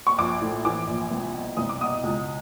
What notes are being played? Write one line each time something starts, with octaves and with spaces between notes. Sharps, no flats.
C#6
A#1 D6
A2
E3 D6
A#1
C2
B2
C2 D#6
D6
B2 D#6
C#2